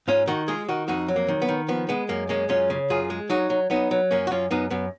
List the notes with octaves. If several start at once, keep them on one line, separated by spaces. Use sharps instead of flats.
G#2 C#4 F4
D#3 D#4 F#4
G#3 F4 G#4
D#3 D#4 F#4
F2 D#4 F#4
F#3
A#3
D#3
B3
D#3
F3 B3
G#3 B3
F#2 A#3
G#3 A#3 C#4
F#2 C#4 F4
C#3
F#2 F4 G#4
G#3
F#3 D#4 F#4
F#3
F#3 B3 D#4
F#3
F#2 A#3 C#4
F#4
F#2 C#4 F4
F#2 B3 D#4
F#2 B3